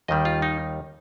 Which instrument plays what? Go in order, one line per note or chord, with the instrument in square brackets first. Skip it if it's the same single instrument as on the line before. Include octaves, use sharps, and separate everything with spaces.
[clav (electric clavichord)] D#2 D#3 G3 D#5
F4
D#4